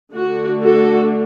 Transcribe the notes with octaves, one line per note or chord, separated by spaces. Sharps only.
D3 A3 D4 F#4
F#4 A4